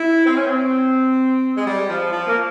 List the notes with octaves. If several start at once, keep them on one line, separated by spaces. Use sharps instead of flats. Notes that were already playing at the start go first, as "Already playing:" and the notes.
Already playing: E4
C4
C#4
C4
G#3
G3
F3
F3
A#3